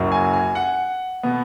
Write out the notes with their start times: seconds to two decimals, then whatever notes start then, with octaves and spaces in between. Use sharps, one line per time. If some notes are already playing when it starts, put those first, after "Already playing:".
Already playing: F#1 F#2 F#3
0.12 G#5
0.33 G#5
0.55 F#5
1.23 B2 B3